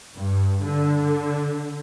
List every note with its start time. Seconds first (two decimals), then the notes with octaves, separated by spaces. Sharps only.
0.15 G2
0.64 D3